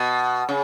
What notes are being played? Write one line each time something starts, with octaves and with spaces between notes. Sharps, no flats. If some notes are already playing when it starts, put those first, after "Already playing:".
Already playing: B2
C#3